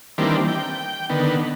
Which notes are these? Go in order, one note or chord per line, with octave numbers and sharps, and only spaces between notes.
D#3 E3 G3 A#3 C4 D4
G5
D3 D#3 B3